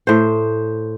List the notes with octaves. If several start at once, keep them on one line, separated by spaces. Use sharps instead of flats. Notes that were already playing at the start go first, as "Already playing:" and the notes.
A2 C5